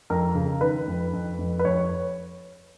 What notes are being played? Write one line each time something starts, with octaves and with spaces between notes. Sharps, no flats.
F2 A#4
C#3
D#3 B4
F2
F2
F2
B4
F2 C#5